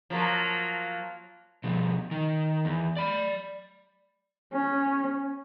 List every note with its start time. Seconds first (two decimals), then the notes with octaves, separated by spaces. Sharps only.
0.10 F3 F#3 A#3
1.64 B2 F3
2.11 D#3
2.65 E2
2.96 D5 B5
4.53 C#4